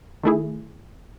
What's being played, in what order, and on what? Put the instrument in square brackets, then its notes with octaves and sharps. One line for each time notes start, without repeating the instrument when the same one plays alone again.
[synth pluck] D#3 A3 E4 G#4